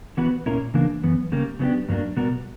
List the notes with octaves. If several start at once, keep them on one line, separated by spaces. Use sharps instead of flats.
E3 B3 F#4 B4
A#2 A#3 C#4 E4 A#4
C#3 E3 A#3 D4 A#4
F#2 E3 B3
C#3 G3 A#3
C#3 F#3 B3 D4 G4
G2 F#3 A#3 D4
B2 G3 B3 F#4 A#4